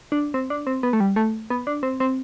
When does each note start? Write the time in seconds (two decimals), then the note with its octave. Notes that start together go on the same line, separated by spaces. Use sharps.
0.12 D4
0.34 C4
0.50 D4
0.67 C4
0.83 B3
0.93 A3
1.00 G3
1.16 A3
1.50 B3
1.67 D4
1.83 C4
2.00 C4